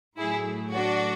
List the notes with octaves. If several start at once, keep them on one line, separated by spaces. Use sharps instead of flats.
A2 F#3 A3 E4 G#4
D4 F#4